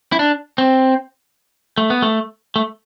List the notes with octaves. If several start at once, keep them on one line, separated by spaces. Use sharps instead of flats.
E4
D4
C4
A3
B3
A3
A3